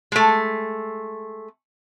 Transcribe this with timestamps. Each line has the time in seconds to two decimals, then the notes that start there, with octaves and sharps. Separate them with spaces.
0.12 G#3 A3